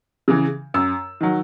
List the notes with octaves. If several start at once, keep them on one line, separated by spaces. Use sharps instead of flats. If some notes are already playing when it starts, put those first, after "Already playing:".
C#3 E3
F#2 E6
D#3 F#3